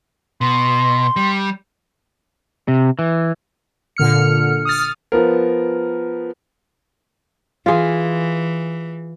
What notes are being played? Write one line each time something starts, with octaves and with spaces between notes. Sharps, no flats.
B2 C6
G3
C3
E3
A#2 D3 F6 C#7
D#6 F6 A6
F3 B3 A#4
E3 F4 G#4